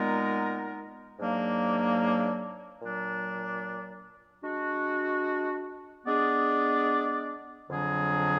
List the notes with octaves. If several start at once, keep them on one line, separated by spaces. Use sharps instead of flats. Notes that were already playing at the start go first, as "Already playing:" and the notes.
Already playing: A#2 G#3 B3 D#4 A#4
G#2 F#3 A#3 D4
A#2 F#3 D4
G#3 D4 F#4
G#3 B3 D4 G#4 D5
F2 D3 F#3 D4 G#4